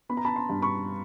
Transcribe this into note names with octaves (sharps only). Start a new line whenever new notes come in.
B3 B5
A#5
A5 B5
A#5 C6
G2
B5 C#6